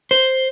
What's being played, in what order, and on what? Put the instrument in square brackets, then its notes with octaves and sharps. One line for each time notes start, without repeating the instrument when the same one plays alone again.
[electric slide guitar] C5